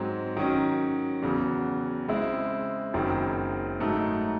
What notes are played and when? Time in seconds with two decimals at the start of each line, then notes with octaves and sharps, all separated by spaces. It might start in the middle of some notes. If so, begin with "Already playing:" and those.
Already playing: G#2 F#3 C4
0.37 D#3 F#3 C#4
1.22 E2 C#3 F#3
2.08 C#3 G#3 C4 E4
2.93 F#1 F#2 D#3 F#3 C4
3.80 G#2 F#3 A3 D#4